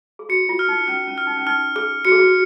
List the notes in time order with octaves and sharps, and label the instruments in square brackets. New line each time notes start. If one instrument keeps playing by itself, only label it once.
[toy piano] G#4
[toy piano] F#4 [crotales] C#7
[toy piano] F4
[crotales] F6
[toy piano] D#4
[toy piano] C#4 [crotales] F6
[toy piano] C#4
[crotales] F6
[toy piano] D#4
C#4
[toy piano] D#4 [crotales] F6
[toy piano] G#4 [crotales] F6
[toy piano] F#4 [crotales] C#7
[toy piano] G#4
F#4